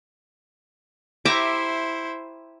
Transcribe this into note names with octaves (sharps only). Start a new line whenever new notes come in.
E4 G4 C5 E5 A#5 D6